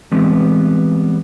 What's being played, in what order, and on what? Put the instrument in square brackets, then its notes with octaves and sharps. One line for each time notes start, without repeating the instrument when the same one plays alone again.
[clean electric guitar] E3 G3 G#3 B3 C4